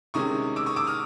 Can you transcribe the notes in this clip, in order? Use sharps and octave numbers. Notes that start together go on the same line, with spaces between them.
C3 D#3 G#3 C#4 C#6 D#6
D6 E6
C#6 D#6
D6 E6
D#6 F6